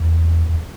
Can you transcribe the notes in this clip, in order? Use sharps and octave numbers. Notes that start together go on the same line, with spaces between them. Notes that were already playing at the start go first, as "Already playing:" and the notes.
Already playing: E2
E2